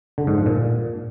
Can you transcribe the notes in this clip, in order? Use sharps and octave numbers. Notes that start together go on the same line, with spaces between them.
D3
G#2
F3
A#2